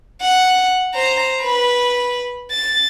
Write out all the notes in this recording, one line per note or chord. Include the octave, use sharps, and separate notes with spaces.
F#5
C5 A#5
B4 B5
A6